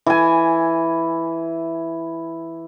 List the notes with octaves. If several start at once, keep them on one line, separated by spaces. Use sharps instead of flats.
E3 G#5